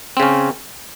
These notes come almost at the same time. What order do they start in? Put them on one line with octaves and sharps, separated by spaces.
C4 C#3 C#4